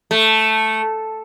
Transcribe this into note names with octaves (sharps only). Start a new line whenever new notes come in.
A3